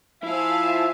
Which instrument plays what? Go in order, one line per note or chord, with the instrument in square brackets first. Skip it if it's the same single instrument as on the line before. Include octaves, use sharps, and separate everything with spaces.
[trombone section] F3 [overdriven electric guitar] E4 [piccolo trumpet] E5 [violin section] F5 G#5 A5